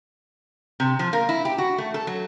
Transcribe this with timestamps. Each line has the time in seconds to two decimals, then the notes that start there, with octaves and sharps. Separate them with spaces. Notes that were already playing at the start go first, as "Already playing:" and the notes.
0.80 C3
0.99 F3
1.13 A#3
1.29 E4
1.45 G4
1.58 F#4
1.78 A3
1.94 A4
2.07 F#3